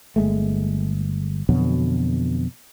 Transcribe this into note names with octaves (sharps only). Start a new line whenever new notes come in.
G1 G#3 A3
F2 B2 D3 F#3